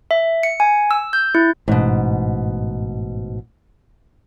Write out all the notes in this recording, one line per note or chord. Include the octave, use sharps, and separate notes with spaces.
E5
C#7
G#5
E6
G6
E4
A1 G#2 B2